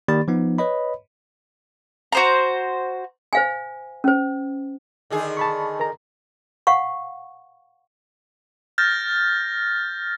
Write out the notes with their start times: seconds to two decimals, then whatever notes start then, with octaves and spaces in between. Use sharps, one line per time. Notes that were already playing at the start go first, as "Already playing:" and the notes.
0.08 D#3 A#3 G4 D5 B5 A6
0.28 F3 B3 D#4
0.58 B4 C#5 D#5 B5
2.12 F#4 C5 A#5
3.33 C5 F5 G#5
4.04 C#4 C5
5.10 D3 D#3 G#4
5.37 A5 B5 C#6
5.80 A#4 A#5
6.67 F5 F#5 C#6
8.78 F6 G6 A6 A#6